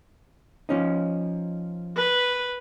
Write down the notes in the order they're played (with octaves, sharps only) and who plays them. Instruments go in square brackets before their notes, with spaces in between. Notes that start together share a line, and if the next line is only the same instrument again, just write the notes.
[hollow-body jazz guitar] F3 C#4 D#4
[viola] B4